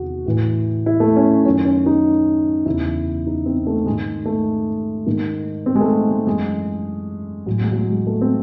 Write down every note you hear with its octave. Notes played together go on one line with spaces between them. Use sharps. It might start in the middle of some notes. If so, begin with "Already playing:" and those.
Already playing: E2 C3 D#3 F#4 G#4
A2 E3
E4
A3
C#4
F#2 D#3 C#4
C#4
D#4
E2 C#3 E3 E4
D#4
C4
A3
G#2 D#3 G#3
A3
G#2 D#3
C4
G#3
A3
G#3
F#2 E3 G#3
A2 E3 F#3
G#3
F#3
G#3
G#3
A3
C4